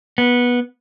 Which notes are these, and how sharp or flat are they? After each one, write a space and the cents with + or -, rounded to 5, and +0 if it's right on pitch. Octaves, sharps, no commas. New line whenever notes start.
B3 -15